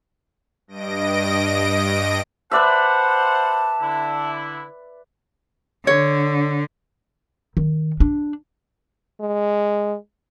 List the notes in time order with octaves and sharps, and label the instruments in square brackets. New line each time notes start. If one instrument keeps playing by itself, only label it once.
[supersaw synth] G2 D#5 A#6 D7
[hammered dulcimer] B4 D5 E5 [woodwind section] C5 F#5 [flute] A5
[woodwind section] D3 E4
[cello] D3 [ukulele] C#5
[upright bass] D#3
D4
[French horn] G#3